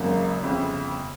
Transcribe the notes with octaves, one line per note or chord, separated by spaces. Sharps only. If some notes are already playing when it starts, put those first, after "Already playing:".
Already playing: G#1 F#2 C#3 F#3 A#3
G1 F2 C#3